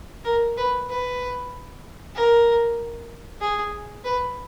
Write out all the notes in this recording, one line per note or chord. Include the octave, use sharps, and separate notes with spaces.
A#4
B4
B4
A#4
G#4
B4